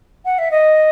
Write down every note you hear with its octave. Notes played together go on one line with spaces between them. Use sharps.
F#5
E5
D#5